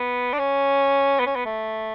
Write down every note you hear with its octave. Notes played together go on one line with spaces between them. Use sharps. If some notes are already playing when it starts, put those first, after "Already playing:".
Already playing: B3
D4
C#4
B3
C#4
B3
A3